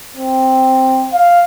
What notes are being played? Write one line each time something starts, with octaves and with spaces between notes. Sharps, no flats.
C4
F5